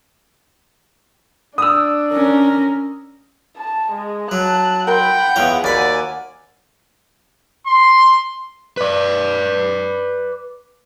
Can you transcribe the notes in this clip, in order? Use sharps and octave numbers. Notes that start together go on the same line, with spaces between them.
D4 D#6 E6
C#4 A#4
A5
G#3
F#3 A5 F#6
A#4 F#5 G5 B5 C6
E2 F4 C#5 D#6
D#2 F#4 D5 F#5 G#5 B5
C6
B4 D5